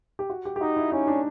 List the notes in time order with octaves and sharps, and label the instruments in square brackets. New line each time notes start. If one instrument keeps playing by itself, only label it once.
[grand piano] G4
F#4
G4
G4
[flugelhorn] D#4 [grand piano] F#4
[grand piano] E4
[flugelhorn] C#4 [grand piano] D#4
[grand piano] D4